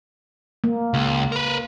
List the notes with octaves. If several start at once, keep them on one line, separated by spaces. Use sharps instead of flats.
A#3
C#2
A#4 B4